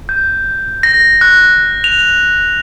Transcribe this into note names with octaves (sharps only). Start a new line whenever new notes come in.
G6
A#6
F#6
F7